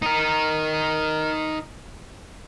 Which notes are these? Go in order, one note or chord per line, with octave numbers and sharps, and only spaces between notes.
D#4 A#4